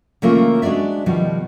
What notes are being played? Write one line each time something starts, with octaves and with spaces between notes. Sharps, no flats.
C#3 E3 A3 A#3 F4
G#3 D4 F#4 D5 E5
B2 D#3 F3 G3